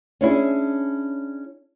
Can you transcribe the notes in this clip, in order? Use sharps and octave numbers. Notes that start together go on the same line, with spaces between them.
C#4 D4 E4 G#4